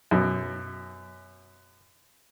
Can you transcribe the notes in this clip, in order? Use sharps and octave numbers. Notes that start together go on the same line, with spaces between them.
F#2 B2